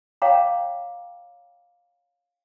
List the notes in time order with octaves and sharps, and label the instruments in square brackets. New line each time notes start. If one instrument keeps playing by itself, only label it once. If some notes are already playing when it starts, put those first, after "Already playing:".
[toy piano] C#5 F5 G5 A5 A#5 D6